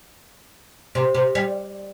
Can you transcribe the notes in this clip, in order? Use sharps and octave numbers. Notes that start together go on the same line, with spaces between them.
C3
C3
G3